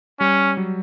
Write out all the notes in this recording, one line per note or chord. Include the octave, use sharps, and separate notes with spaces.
G3 C#4
F#3